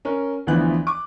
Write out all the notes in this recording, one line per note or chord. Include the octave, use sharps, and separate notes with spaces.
C#4 A#4
D2 E3 F3 B3 E4 F#6
D6